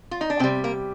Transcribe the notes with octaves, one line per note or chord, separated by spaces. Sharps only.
F4
D#4
D4
C3 G3 C4
A#3